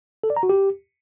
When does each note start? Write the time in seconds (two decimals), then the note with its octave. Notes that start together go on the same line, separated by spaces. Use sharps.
0.24 A4
0.30 D5
0.36 A#5
0.43 F#4
0.49 G4